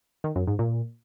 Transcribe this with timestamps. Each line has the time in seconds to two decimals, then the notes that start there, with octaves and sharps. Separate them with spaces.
0.24 D#3
0.36 F#2
0.47 G#2
0.59 A#2